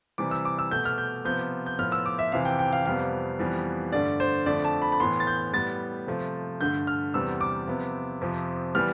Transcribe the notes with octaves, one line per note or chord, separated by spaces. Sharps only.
C3 E3 G3 D6
E6
D6
E6
B2 A3 G6
F6
G6
C3 F3 B3 G6
G6
A2 F3 B3 F6
E6
D6
E5
F2 C3 E3 F5
G5
G5
F5
F2 C3 G3 B3 F5
F2 E3 G3 B3
G2 D3 A3 D5
C5
F2 D3 A3 D5
A5
B5
B5
A2 E3 B3 C6
A6
G6
A2 G3 B3 A6
C3 F3 A3
G2 D3 A3 G6
F6
E2 C3 G3 B3 E6
D6
C3 F3 B3
F2 C3 F3
E3 G3 B3 F6